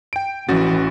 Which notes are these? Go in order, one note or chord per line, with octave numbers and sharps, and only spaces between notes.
G5 D7
A1 E3 C#4 F#4 A6